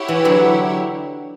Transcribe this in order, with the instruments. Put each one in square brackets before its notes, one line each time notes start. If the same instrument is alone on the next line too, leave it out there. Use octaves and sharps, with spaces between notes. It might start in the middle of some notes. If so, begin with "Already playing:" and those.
Already playing: [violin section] E4 G4 C#5 F#5
[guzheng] E3
D3 F#3